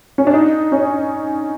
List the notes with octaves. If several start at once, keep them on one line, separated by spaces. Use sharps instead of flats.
C#4
D4
D#4
C#4